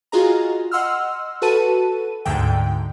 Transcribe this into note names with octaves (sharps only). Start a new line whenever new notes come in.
F4 F#4 G#4 D#5 A#5
D#5 F#5 C6 E6 F6
F#4 A4 B4 A5 D#7
D2 G#2 D3 G5